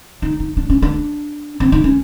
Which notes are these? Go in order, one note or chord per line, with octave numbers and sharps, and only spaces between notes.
D#4
D#4
D4
C#4
D4
C4
D#4
C#4